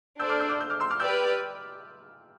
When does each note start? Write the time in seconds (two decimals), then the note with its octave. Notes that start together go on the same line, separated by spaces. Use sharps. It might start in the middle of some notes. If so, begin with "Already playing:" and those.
0.19 D4 A4 C5 E6 G6
0.29 D6 F6
0.39 E6 G6
0.49 D6 F6
0.60 E6 G6
0.70 D6 F6
0.80 C6 E6
0.90 D6 F6
1.00 G4 B4 D5 E6 G6